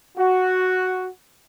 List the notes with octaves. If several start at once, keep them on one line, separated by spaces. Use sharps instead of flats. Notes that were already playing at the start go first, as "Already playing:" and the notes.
F#4